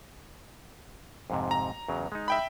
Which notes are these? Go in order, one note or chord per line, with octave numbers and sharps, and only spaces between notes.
F2 G#2 C3
A#5
E2 C#3 F#3
G#3 D#4
E5 G5 B5